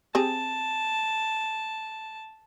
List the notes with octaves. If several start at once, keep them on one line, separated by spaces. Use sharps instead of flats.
C4 G4 G#4 A5